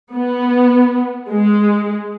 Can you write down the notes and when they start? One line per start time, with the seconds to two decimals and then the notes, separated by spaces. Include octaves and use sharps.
0.13 B3
1.31 G#3